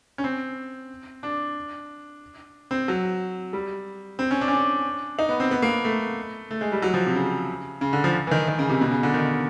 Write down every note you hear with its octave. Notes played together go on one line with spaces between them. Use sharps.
C#4
C4
D4
C4
F#3
G3
C4
C#4
D4
C#4
D4
D#4
B3
C4
B3
A#3
B3
A3
A3
G#3
G3
F#3
F3
C3
C#3
C#3
D3
F3
E3
D#3
D#3
C#3
C3
B2
C#3
D3
D#3